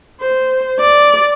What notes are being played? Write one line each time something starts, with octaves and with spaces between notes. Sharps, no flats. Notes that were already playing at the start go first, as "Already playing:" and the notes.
C5
D5